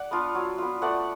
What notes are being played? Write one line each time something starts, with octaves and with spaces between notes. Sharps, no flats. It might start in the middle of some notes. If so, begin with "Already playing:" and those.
Already playing: D5 F#5
B3 D4 F4
F#3
B3 F4
A3 D5 F#5